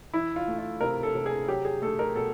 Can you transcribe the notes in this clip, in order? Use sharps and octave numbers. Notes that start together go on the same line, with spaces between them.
E3 E4
F4
A3
F4
C3 A#4
A4
C3
G#4
F#3 G4
G#4
A3 A4
A#4
B2 A4